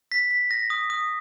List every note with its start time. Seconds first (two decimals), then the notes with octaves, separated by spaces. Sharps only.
0.12 B6
0.31 B6
0.51 A#6
0.70 D#6
0.90 D#6